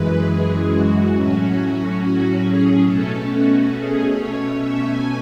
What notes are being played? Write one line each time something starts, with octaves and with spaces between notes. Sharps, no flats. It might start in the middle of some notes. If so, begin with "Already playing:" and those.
Already playing: F#2 E3 G#3 B4
G#4
F#4
A2 F#3 C#4 F#4
F#4
G#4
B2 A3 C#4 A4
F#4
G#4
C#5
B2 A3 C#4 E5
G#5